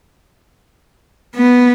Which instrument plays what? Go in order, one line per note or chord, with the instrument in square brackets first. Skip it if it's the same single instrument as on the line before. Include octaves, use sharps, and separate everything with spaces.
[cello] B3